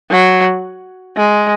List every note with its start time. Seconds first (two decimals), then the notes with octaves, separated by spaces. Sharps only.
0.11 F#3
1.17 G#3